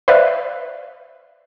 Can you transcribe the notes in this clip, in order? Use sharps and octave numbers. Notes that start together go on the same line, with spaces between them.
B4 C5 D5 E5 F5